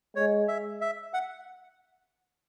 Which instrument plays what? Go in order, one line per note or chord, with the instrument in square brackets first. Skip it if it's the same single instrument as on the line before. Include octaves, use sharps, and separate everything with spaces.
[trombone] G#3 [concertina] C#5
[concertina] E5
E5
F#5